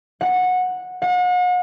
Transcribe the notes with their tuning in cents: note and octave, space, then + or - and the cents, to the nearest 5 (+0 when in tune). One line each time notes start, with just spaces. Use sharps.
F#5 -15
F#5 -40